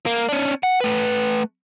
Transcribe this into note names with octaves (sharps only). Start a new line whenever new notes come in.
A#3
C#4 D4
F#5
A3 B4